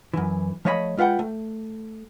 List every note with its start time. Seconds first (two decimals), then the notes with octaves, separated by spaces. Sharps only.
0.14 F#2 E3
0.65 F3 A3 C#5 D#5 A5 B5
0.97 G#3 F4 B4 F#5 G5
1.19 A3